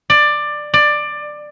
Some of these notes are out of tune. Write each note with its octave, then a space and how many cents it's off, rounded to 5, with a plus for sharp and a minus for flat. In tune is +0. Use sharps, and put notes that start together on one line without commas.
D5 +15
D5 +15